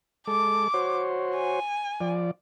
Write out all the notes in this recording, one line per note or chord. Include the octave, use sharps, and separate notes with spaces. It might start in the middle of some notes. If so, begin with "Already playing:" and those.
G#3 A4 D6
F#4 C5 C#5
G#5
F3 D5